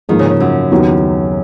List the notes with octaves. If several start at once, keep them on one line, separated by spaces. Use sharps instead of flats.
G#2 D#3 F3 A#3 D#4
C#3
C#3
F#2
D#2 D#3 F#3 B3